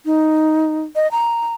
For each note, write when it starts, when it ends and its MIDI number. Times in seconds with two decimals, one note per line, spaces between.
0.05 0.81 63
0.96 1.10 75
1.12 1.55 82